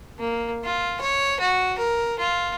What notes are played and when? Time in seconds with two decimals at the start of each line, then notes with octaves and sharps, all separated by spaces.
0.19 A#3
0.64 F4
1.01 C#5
1.40 F#4
1.78 A#4
2.19 F4